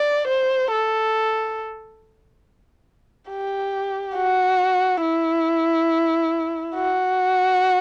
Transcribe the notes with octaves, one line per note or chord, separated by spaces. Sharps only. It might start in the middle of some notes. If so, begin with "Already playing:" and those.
Already playing: D5
C5
A4
G4
F#4
E4
F#4